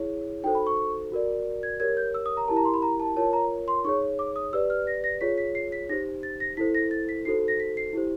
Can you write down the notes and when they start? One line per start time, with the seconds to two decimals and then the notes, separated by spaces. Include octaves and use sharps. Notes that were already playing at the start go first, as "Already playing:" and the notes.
Already playing: E4 G#4 C#5
0.43 D#4 F#4 A4 C5 G5
0.55 B5
0.67 C#6
1.12 F#4 A#4 D5
1.63 G#6
1.80 G4 A#4 C#5 G#6
1.97 G6
2.14 E6
2.26 D#6
2.37 A#5
2.48 E4 G4 A#4 A5
2.57 A#5
2.65 C6
2.74 B5
2.82 A#5
3.00 A5
3.16 F4 A#4 C#5 A5
3.33 A#5
3.68 C6
3.84 D#4 G#4 C#5 C#6
4.19 D6
4.36 D#6
4.53 G4 B4 D5 E6
4.70 F6
4.87 A#6
5.04 A#6
5.21 F4 G#4 C#5 B6
5.38 B6
5.55 C7
5.72 B6
5.89 D#4 G4 C5 A#6
6.23 A6
6.40 A#6
6.57 E4 A4 C5 B6
6.75 A#6
6.91 A6
7.09 B6
7.25 D#4 F#4 A4 C5 C7
7.48 A#6
7.60 B6
7.77 C7
7.93 E4 G4 C5